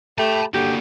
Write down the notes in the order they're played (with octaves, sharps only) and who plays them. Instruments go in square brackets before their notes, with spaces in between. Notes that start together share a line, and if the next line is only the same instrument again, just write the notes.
[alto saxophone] A3 [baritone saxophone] G4 [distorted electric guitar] A5 B5
[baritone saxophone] D3 [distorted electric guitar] A#3 F#4 [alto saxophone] G4